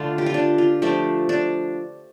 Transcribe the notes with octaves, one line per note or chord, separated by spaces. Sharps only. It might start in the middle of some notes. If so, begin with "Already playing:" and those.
Already playing: D3 A3 D4 F4
G4
F4
D4
F4
F3 A3 D4 G4
D4